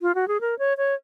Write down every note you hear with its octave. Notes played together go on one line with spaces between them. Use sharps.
F4
F#4
G#4
A#4
C#5
C#5